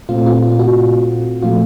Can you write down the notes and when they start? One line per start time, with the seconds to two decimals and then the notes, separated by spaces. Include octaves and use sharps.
0.09 A#2 A3 C4 F4
0.26 F4
0.43 F4
0.59 F#4
1.43 A#2 F3 A3 F4